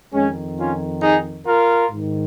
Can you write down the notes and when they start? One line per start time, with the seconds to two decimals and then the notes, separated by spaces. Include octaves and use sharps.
0.13 F2 D#3 G#3 C#4
0.58 C#4 F4
1.02 D#4 G#4
1.46 F4 A#4
1.91 G#2 D#3